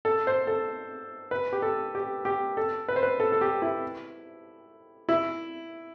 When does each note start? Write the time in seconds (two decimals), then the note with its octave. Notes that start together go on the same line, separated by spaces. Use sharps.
0.05 A4
0.27 C5
0.47 A4
1.31 B4
1.53 G4
1.62 A4
1.95 G4
2.25 G4
2.57 A4
2.88 B4
2.96 C5
3.03 B4
3.20 A4
3.32 A4
3.41 G4
3.62 E4
5.09 E4